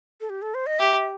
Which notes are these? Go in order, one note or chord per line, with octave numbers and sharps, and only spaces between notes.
A4
G4
A4
C5
D#5
G4 E5